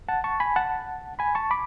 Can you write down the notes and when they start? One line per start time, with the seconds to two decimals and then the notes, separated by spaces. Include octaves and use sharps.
0.08 F#5 A5
0.24 A5 C#6
0.40 G#5 B5
0.56 F#5 A5
1.19 G#5 B5
1.35 A5 C#6
1.51 B5 D6